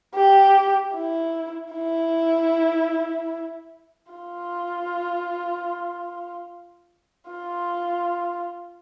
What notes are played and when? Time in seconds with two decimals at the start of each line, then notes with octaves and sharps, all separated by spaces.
0.15 G4
0.94 E4
1.74 E4
4.12 F4
7.31 F4